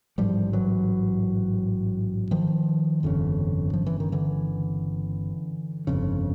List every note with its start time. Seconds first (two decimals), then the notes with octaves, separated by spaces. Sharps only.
0.18 A1 G#2 F3 G3
0.53 E3 F#3
2.31 D#3 F3
3.03 G1 F2 C#3
3.73 F3
3.86 E3
4.00 D#3
4.12 D3 E3
5.87 G1 F2 C#3